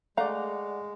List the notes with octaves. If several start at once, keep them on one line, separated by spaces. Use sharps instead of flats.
G#3 A3 D5 F5 F#5 A#5